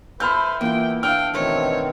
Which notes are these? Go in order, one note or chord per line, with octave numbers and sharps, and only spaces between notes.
E4 A4 B4 C5 B5 F6 G6
E2 A#3 E4 F4 G5 C6
D4 A4 F5 G5 F6
B2 D#3 E3 A3 C4 C5 C#5